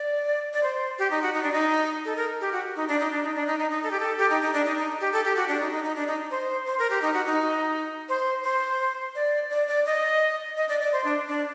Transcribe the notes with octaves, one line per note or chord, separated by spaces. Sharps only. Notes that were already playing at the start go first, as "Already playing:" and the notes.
Already playing: D5
D5
C5
G4
D#4
F#4
D#4
D4
D#4
A4
A#4
G4
F#4
D#4
D4
D#4
D4
D#4
D4
D#4
D#4
D#4
A4
G4
A4
G4
D#4
D#4
D4
D#4
D#4
G4
A4
G4
F#4
D4
D#4
D#4
D#4
D4
D#4
C5
C5
A#4
G4
D#4
F#4
D#4
C5
C5
D5
D5
D5
D#5
D#5
D5
D5
C5
D4
D4